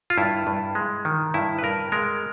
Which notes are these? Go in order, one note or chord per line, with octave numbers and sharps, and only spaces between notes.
F4
G2 E4
G2
G#3
D#3
G2 E4
B4
G2 A#4
G#3 A#4